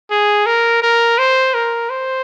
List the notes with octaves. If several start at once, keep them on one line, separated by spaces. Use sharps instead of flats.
G#4
A#4
A#4
C5
A#4
C5